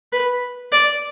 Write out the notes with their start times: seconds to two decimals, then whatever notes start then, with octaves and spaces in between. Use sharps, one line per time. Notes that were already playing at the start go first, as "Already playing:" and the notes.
0.13 B4
0.72 D5